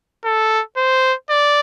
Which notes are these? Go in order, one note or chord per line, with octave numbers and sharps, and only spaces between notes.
A4
C5
D5